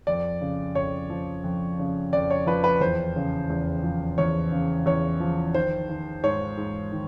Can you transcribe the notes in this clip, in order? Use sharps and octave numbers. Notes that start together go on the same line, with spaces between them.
F2 D5
C#3
F2 C#5
F3
F2
C#3
F2 D5
C#5
F3 B4
B4
E2 C5
C#3
E2
F3
E2 C#5
C#3
E2 C#5
F3
D#3 C5
D#3
G#2 C#5
G#2
D#3